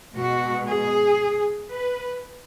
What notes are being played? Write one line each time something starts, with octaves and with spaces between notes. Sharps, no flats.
B2 G#3 F#4
G#4
B4